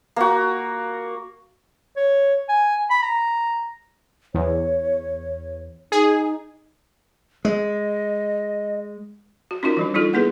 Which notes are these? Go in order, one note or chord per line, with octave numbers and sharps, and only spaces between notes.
A#3 F#4
C#5
G#5
B5
A#5
E2 C#5
D#4 G#4
G#3 D#5
F#4
C#4 D#4 F4 F#4 A#4
E3 G3 D4
G3 D#4 F4 A4
A#3 B3 E4 G#4 B4